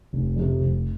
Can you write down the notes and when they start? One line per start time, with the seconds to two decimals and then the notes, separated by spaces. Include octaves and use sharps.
0.13 F1
0.36 F2 C3
0.61 F1